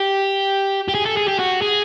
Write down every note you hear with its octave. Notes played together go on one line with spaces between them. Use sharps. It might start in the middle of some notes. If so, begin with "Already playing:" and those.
Already playing: G4
G4
G#4
A4
G#4
G4
F#4
G#4